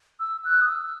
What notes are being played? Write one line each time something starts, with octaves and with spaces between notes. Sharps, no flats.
E6
F#6
D#6
E6